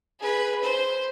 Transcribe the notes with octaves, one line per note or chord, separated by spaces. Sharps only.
G#4 B4
C5